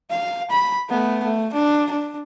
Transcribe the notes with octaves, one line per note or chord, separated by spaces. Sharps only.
F5
B5
A3 B3
A3
D4
D4